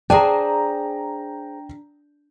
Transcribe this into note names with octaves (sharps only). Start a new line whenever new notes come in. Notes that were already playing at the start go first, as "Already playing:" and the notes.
D4 G#4 C5 G5 G#5 A#5